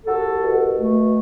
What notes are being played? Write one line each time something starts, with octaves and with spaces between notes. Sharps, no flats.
C2 F#4 A4
B2
A3